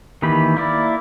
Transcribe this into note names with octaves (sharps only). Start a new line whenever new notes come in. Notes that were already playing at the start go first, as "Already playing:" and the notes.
D#3 E3 A#3 G4 B5
A#3 E4 D5